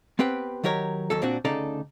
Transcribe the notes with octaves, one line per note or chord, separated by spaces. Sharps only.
B3 C4 G4 B4 G5
D#3 F#3 G4 A#4 C#5
D#2 F#3 A4
A#2 C4 D4 F#4
D2 C#3 D#4 A4 D5 A#5